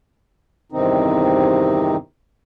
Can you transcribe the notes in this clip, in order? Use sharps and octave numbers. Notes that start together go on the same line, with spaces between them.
E2 G2 C3 D#3 C4 D#4